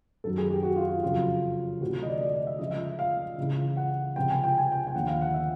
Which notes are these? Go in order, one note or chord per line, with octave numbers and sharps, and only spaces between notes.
F#2 D#3 F#3 A4
G#4
G4
F#4
F4
F4
F2 C#3 F#3 F4
D2 C3 E3 F#4
D#5
D5
D5
D#5
E5
C#2 C#3 F3 D#5
E5
F5
C#2 C#3 E3
F#5
C#2 C3 F3 G5
G#5
G5
G#5
G5
G5
D#2 D3 F3 F#5
F5
F#5
E5